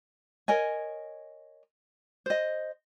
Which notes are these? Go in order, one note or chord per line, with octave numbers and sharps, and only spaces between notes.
A#4 C#5 D#5 G#5
C5 D#5